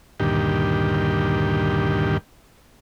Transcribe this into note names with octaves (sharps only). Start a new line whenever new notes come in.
D2 G2 A#2 D#3 G4